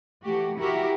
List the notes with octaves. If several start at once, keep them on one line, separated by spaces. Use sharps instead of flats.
E3 A3 F#4 G4
E4 F#4 G4 A#4 E5